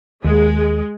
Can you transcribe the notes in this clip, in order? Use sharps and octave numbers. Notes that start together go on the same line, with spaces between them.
D#2 G#3